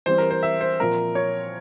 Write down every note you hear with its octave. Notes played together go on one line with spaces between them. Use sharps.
E3 G3 C4 C5
A#4
C5
E5
C5
A#2 F3 C4 A#4
C#5